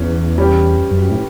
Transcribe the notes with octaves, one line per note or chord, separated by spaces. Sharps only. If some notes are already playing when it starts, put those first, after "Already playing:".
Already playing: E2 E3 C#4
G3 C#4 G4
F#2
A2